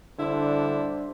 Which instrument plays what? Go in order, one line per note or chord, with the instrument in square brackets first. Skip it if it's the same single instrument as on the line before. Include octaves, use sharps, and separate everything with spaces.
[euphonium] D3 [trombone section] G3 D4 C5 [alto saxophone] E4